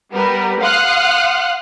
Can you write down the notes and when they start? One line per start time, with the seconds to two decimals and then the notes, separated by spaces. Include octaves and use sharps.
0.13 G3 B3 A#4 B4
0.61 F5 F#5 C6 D#6 F6 F#6